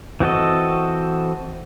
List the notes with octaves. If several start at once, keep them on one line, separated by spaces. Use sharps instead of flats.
E3 C4 F#4 A4 D#5